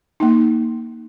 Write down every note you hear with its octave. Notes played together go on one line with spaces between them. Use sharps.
A#3 D#4